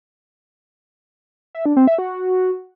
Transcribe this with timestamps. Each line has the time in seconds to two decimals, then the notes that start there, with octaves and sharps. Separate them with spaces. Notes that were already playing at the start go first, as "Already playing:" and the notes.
1.55 E5
1.66 D4
1.77 C4
1.88 E5
1.98 F#4